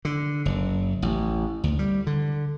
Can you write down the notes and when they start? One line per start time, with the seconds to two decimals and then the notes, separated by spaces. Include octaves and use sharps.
0.05 D3
0.45 F#1
1.02 A1
1.64 D2
1.79 G3
2.07 D3